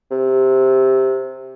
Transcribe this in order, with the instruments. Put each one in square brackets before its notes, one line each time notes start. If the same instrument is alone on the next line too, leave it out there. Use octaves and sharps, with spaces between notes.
[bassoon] C3